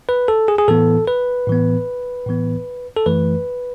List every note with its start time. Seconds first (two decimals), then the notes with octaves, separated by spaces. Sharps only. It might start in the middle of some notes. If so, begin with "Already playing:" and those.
0.09 B4
0.28 A4
0.48 G#4
0.58 G#4
0.68 A2 E3 B3 A4
1.08 B4
1.48 A2 E3 B3
2.27 A2 E3 B3
2.97 A4
3.06 F#2 E3 A3 B4